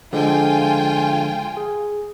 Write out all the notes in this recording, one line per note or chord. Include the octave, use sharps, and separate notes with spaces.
D3 F3 G#3 F4 G5 G#5
G#4